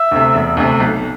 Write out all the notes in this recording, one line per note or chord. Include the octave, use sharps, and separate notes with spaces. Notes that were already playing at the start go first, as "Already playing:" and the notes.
Already playing: E5
D2 C3
E1
D2 C3
B1